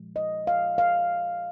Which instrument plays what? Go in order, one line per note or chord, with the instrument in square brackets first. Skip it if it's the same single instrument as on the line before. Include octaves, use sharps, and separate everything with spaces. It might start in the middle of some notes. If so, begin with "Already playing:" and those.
Already playing: [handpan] A#2 F3 G#3
D#5
F5
F5